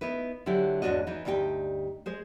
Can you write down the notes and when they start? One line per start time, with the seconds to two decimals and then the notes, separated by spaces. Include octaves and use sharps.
0.01 B3 D#4 E4 B4
0.46 D3 F#3 E4 G4
0.82 E2 G#2 C#4 D4 F#4 D#5
1.07 E3 D#4
1.25 D2 G2 D#4 G4 G5
2.06 G#3 G#4 C5